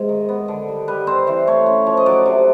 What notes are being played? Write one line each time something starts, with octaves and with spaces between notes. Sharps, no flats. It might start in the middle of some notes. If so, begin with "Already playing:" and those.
Already playing: G#2 C3 G#3
D#3
B3
D3
G3
G3 B4
C4 C5
E3 C5
A3 C#5
C#4
F3
D#5
F#3 D5
C3